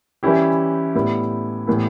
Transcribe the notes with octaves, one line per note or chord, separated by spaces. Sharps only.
E3 G3 C#4 E4 G4
A2 G3 B3 E4
A2 E3 G3 B3 E4